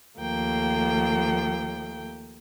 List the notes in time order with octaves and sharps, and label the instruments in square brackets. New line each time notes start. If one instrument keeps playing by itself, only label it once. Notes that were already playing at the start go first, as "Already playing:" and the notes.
[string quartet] D#2 F3 A3 A#3 G5